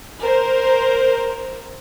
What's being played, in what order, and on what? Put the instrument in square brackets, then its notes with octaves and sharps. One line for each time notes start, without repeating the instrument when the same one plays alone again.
[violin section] A#4 C5